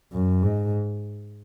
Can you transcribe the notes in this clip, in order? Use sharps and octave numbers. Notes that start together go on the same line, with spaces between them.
F#2
G#2